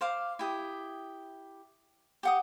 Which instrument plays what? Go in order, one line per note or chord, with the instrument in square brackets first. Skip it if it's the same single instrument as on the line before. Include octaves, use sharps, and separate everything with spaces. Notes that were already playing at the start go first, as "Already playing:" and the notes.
[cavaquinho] C5 F5 D6
E4 G4 D#6
G4 F#5 D#6